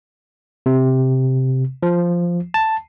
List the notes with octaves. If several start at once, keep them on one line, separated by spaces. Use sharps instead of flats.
C3
F3
A5